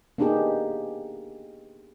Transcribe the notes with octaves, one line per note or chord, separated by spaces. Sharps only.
A#3 B3 D4 D#4 G4 G#4